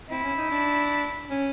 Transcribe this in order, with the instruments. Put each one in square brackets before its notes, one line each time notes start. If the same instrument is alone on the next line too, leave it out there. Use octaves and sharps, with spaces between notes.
[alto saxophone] C4 [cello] E4
[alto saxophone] C#4
D#4
D4
C#4